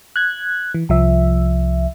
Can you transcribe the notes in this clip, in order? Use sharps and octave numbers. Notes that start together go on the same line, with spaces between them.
F#6 G#6
E3
C2 F3 E5